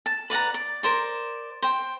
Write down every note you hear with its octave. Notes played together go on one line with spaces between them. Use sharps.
A5
B4 D5 F#5 A#5
D5
A#4 C5 D5
C5 G5